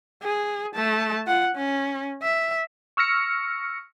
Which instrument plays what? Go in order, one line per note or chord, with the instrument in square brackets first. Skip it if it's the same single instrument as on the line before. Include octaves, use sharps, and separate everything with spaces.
[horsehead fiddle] G#4
A3 A5
F4 F#5
C#4
E5
[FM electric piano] C#6 E6 F6 A#6 C#7